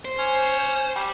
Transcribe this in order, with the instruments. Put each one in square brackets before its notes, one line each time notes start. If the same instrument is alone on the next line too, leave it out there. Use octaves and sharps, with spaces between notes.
[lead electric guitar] C5
[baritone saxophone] C#4
G3